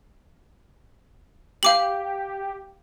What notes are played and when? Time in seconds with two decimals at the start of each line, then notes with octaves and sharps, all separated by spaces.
1.63 G4 F5 D6 F#7